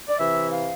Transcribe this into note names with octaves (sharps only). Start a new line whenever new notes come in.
D5
C3 E3 E5
F5